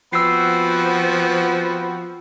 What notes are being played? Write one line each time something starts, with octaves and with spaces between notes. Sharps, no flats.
F3 B3 C4 F#4 E6 C7